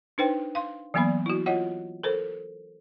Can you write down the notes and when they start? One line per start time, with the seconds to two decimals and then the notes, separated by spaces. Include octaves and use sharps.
0.18 D4 D#4 B4 C5 G5
0.55 F5 C6
0.94 E3 F#3 A#3 B3 D5 B5
1.26 E4 F#4
1.46 F4 C#5 D#5 F#5
2.03 A4 A#4 C5